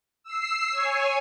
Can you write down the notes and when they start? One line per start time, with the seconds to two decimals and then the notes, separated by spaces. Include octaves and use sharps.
0.24 E6 C7
0.71 C#5 G#5